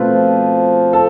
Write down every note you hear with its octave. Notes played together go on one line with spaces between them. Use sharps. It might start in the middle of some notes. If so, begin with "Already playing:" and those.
Already playing: B2 A3 C4 F4 B4
F3
A4